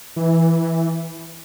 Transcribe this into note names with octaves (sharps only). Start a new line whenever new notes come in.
E3